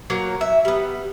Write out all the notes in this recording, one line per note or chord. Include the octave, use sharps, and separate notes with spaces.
F#3 A#3 C#5
E5
G3 B3